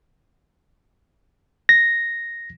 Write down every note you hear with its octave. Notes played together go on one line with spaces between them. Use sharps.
A#6